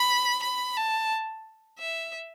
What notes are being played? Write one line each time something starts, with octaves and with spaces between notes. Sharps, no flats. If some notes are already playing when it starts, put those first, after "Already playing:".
Already playing: B5
B5
A5
E5